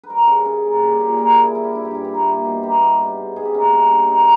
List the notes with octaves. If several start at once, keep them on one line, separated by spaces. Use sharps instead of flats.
B4
G3 A#4
C#3
C#3 G#4
A#3
G3 G4
A#2 G4
G#4
A#2 A#4
G#4
A#3
E4
G3 E4
G4
G2 E4
G4
G2 E4
A#3 G4
E4
A#3
B2
A#3 G4
B2
G3
G#2
G#2 G#4
G4
A#3 C#4
G3 D#4
G2
G2 D#4
A#4